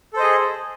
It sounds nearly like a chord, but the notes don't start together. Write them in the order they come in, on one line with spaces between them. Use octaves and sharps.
A4 C5 D#5 G#4